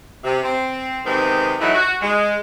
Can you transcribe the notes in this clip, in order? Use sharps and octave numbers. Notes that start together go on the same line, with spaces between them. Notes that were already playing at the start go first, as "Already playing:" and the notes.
C3
C4
C3 D#3 G#3 B3 C4
E3 F#3 A3 D#4 E4
F#4
G#3